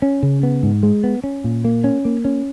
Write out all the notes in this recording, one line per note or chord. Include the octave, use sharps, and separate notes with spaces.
C#4
C#3
B3
G#2
G#3
B3
C#4
A#2
A#3
C#4
A#3
C#4